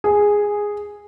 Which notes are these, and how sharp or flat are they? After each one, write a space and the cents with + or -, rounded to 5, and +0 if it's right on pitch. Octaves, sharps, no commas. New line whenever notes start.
G#4 -5